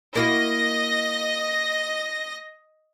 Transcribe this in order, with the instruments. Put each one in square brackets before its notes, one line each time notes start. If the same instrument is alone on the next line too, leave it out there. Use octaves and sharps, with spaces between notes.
[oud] A#3 E4 F#4 [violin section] D#5 A#6